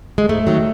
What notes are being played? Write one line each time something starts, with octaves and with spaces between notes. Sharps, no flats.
G#3
G#2 A3
D#3 F#3